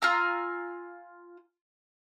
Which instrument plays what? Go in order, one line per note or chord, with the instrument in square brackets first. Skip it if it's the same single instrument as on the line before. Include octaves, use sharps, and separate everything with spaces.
[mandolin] F4 G#5 A#5 E6